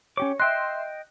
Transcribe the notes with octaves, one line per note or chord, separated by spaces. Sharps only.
C#4 G4 C#5 D6
D#5 E5 G5 C6 F#6